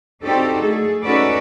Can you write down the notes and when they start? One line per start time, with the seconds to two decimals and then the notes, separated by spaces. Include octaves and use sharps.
0.23 C4 D4 D#4 F#4 G4 A4
0.63 A3 G#4 A4
1.03 C#4 D#4 F#4 A4 B4 D5